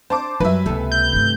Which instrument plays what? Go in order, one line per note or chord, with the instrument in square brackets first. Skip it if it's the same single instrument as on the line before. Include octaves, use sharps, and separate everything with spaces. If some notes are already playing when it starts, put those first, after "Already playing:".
[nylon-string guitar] D4 [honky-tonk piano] C5 A5 D6
[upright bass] F#2 [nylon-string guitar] F#3 G3 [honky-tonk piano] B4 E5
[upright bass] C#2 A#3 [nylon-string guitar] C3 A4
[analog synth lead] G6
[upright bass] G2 A3